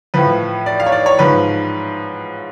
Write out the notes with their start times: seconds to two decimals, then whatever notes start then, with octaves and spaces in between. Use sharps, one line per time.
0.14 A2 F3 B4
0.66 D5
0.80 F5
0.86 C#5
0.92 D5
1.06 C#5
1.19 G#2 F3 B4